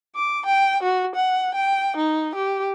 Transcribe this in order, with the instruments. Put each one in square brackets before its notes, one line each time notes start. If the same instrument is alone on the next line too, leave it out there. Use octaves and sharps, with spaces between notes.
[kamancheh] D6
G5
F#4
F#5
G5
D#4
G4